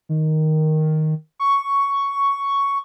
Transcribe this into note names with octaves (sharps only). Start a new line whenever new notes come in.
D#3
C#6